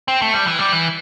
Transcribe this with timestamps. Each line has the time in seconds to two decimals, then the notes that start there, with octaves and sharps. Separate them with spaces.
0.08 C4
0.22 A3
0.34 G3
0.47 E3
0.59 G3
0.72 E3